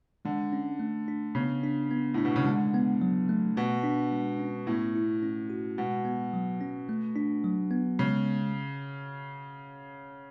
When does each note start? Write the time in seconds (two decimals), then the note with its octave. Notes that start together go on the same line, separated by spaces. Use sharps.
0.25 D3 G#3
0.53 C#4
0.79 A3
1.08 D4
1.35 C#3 B3
1.64 D4
1.91 B3
2.14 A2 D4
2.25 B2
2.36 C#3
2.46 D3 G#3
2.74 B3
3.02 F#3
3.29 A3
3.57 B2 B3
3.84 D4
4.12 G#3
4.40 C#4
4.67 A2 B3
4.96 E4
5.23 C#4
5.50 F#4
5.78 B2 G#3
6.05 B3
6.33 F#3
6.61 C#4
6.89 A3
7.16 D4
7.44 F#3
7.71 B3
7.99 C#3 G#3